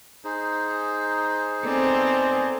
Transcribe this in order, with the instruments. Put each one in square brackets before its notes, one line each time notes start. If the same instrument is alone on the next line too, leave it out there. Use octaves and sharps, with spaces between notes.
[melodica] D#4 G#4 C5
[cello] B3 C4 [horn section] A4 D5 G#5